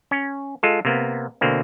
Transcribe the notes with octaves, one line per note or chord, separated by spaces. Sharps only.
C#4
G#3 F4 A4
C3 A#3 B3
B2 D3 A#3 C4